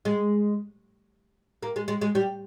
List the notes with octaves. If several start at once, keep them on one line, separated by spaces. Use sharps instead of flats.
G#3
A#3
G#3
G#3
G#3
G3